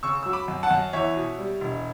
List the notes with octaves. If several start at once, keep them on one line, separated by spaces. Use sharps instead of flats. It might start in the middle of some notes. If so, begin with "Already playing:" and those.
C#3 C#6 E6
F#3 E6
B5 D6
F#2
F#5 A5
F#2
E2 C#5 E5
B2
G3
E1